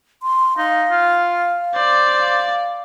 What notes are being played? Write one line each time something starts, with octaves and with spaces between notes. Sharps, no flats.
C6
D#4 F5
F4
C5 D5
F5